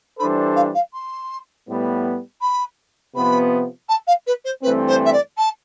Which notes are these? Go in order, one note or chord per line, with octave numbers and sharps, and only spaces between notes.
E3 G3 D4 A4 C5 B5
F5
F5
C6
A2 G3 B3
B5
C3 F3 B3 B5
A5
F5
B4
C5
G2 E3 A3 C4 B4
C5
E5
D5
A5